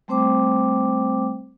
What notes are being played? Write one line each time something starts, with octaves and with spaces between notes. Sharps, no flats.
G3 A3 C4 C5 G5 D6